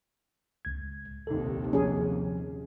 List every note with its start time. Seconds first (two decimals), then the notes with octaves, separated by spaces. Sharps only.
0.65 C#2 G#6
1.27 A#1 D#2 C3 D#4 A4
1.73 F3 C#4 G#4